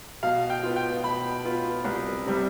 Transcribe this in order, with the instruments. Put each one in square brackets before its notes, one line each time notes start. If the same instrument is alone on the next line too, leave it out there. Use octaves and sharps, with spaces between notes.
[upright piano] B2 F5
G5
B3 F4
G5
B2 B5
B3 F4
C2
C3 G3